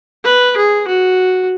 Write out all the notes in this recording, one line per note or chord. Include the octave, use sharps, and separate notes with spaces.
B4
G#4
F#4